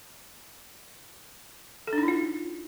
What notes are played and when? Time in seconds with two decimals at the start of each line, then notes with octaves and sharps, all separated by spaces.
1.87 A4
1.93 D4
1.98 D#4
2.03 E4
2.08 F4